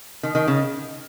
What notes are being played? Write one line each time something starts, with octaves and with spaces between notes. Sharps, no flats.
D#3
D#3
C#3